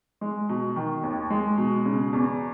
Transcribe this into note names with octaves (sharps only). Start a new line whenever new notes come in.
G#3
B2
D#3
D#2
G#3
B2
C#3
E2